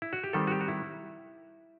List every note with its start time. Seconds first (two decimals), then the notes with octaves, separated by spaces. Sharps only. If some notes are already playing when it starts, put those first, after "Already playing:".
0.02 E4
0.13 F#4
0.24 G4
0.33 D#3 G3 C4 A4
0.47 F#4
0.51 G4
0.61 F#4
0.68 E4